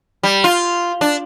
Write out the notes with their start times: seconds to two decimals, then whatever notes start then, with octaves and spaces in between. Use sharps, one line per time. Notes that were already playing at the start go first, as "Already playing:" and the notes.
0.23 G3
0.44 F4
1.01 D4